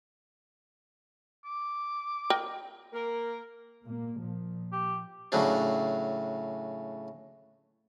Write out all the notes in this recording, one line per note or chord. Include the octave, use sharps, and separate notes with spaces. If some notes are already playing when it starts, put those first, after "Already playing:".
D6
A#4 D#5 G5
A#3 A#4
A#2 A#3
A#2 F3
G4
A2 C#3 F#3 D4